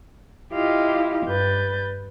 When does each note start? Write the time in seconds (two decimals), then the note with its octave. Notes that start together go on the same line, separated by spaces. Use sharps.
0.52 E4 F4 G4 D#5 F5
1.26 G2 B4 G6 A6